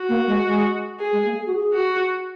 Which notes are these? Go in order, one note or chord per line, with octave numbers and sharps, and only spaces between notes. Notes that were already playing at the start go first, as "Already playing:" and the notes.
Already playing: F#4
A#3
G#3
G#3
G#4
G#3
A#3
G#4
F#4
G#4
F#4